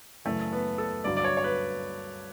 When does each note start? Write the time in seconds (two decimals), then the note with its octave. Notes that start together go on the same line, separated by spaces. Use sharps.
0.25 F#2 C#3 E3 A3
0.52 B3
0.78 A4
1.04 G2 D3 F#3 D5
1.17 D5
1.24 C#5
1.37 C#5
1.44 B4